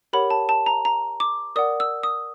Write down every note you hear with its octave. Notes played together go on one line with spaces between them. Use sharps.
G4 A#4 C#5 F#5 B5
A5
A5
A#5
A#5
D6
A#4 D5 F#5 D#6
E6
D#6